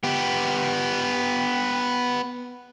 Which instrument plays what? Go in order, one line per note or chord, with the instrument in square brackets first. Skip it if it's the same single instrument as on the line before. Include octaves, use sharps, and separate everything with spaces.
[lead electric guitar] B3 G4